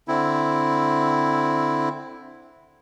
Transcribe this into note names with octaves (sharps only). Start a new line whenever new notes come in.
D3 C4 E4